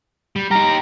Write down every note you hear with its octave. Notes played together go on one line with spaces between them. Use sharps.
G3
D#4 G4 A#5